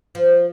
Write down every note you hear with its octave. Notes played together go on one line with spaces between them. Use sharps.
F3